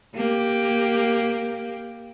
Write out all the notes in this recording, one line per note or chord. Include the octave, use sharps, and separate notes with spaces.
A#3 G4